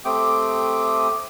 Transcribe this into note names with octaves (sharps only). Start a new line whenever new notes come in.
A3 C4 G4 G5 D6 D#6